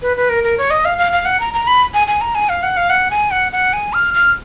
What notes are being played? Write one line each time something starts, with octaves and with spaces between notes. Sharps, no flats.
B4
B4
A#4
A#4
C#5
D#5
F5
F5
F5
F#5
A#5
A#5
B5
G#5
G#5
A#5
G#5
F5
F#5
F5
F#5
G#5
F#5
F#5
G#5
F6
F6